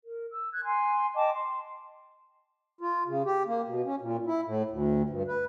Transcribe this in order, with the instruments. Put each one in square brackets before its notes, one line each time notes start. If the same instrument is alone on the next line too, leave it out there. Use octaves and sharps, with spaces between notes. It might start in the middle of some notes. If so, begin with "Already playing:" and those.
[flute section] A#4
E6
F#6 G#6
G#5 C6
D#5 G5 A5 D6
C6
[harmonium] F4
C#3
G4
A#3
B2
C#4
A#2
E4
A2
D2
G2
B4